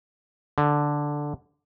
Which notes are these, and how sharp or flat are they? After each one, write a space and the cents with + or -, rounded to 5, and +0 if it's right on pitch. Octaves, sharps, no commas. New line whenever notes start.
D3 +0